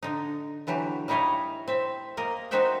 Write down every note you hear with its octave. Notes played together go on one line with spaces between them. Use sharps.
D3 D#4
D3 E3 F#3 G4
G3 D#4 E4 C#5 D#5 F5
C4 E5
A#3 A#4 D#5
C4 D#4 F#4 C5 E5 G5